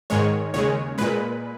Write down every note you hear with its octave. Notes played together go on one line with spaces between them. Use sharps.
G#2 D#3 G#3 C#5
D#2 C#3 G#3 C#5
A#2 G#3 B4